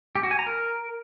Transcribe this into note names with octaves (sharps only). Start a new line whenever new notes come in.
G4
F#4
G#5
A#5
A#4